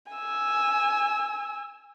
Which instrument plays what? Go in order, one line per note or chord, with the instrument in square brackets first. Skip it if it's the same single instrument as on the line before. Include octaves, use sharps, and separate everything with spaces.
[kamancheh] G#5 E6